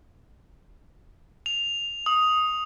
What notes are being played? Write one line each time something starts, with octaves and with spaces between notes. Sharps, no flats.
F7
D#6